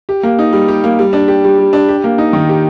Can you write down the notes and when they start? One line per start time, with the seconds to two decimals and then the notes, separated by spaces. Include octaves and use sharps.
0.09 G4
0.23 A#3
0.39 D#4
0.53 G3
0.68 G4
0.84 A#3
0.99 G3
1.13 D4
1.28 G4
1.44 G3
1.58 G3
1.73 D4
1.89 G4
2.04 A#3
2.18 D#4
2.33 D#3
2.49 G4